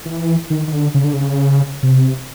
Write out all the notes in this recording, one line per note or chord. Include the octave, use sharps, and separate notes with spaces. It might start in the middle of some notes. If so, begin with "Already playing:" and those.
E3
D#3
D#3
D3
C#3
D3
C#3
C3